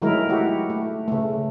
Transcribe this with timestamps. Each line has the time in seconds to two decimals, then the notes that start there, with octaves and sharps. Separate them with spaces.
0.02 D#3 F#3 G#3 A3 E4 A#4
0.29 E4 F#4 G4
0.70 A3
1.08 C#3 A3